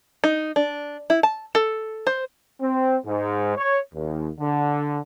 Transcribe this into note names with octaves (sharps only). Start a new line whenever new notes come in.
D#4
D4
E4
A5
A4
C5
C4
G#2
C#5
D#2
D3